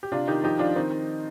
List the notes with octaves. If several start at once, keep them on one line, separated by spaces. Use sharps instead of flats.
G4
C3 D4 F4
D#3 D#4 G4
F3 D#4 G4
F3 D4 F4
D#3 C4 D#4